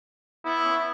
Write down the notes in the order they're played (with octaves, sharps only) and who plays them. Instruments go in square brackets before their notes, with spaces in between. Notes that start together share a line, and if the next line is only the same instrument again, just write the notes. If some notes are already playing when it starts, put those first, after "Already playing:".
[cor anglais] B3 [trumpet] E4
[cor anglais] C#4
B3